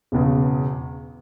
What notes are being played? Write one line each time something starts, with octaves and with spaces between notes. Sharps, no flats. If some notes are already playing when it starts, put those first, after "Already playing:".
E1 E2 C#3